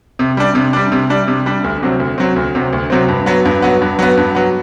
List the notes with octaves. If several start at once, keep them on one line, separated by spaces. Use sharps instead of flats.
C3
G3 D4
C3
G3 D4
C3
G3 D4
C3
G3 D4
D2
C3 F#3 C4
D2
C3 F#3 C4
D2
C3 F#3 C4
D2
C3 F#3 C4
G2
F#3 B3
G2
F#3 B3
G2
F#3 B3
G2
F#3 B3